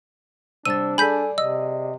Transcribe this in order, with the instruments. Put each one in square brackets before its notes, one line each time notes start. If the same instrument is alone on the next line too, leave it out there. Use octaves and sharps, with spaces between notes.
[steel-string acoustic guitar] C3 G3 [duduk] D4 [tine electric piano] E6 [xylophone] A6 D#7
[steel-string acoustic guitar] G#4 D5 [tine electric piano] A4 G#5 [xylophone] B5 G6 B6
[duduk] C3 [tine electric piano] D#5 [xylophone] E6